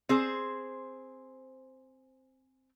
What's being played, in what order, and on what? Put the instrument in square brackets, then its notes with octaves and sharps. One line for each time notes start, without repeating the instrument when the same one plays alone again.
[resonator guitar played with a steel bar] C4 G#4 C5